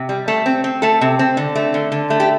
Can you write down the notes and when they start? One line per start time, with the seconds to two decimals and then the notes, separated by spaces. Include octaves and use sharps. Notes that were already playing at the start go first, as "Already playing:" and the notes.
Already playing: C3
0.09 G3
0.28 A3 A4
0.46 C4
0.64 C4
0.82 A3 A4
1.01 C3
1.19 C4
1.37 D3
1.55 A3
1.74 D3
1.92 D3
2.10 A3
2.20 G4